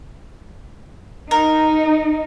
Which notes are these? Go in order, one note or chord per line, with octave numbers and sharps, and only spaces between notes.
D#4 A#4